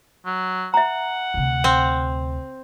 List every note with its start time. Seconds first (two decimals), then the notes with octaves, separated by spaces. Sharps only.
0.26 F#3
0.74 E5 F#5 A#5
1.34 D2 C3
1.64 C4